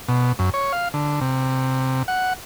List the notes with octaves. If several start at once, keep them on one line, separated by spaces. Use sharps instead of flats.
B2
F#2
C#5
F5
D3
C3
F#5